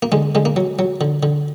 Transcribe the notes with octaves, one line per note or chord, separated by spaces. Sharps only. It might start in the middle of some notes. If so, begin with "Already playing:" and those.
A#3
D3 G#3
D3 G#3
A#3
F#3
F#3
D3
D3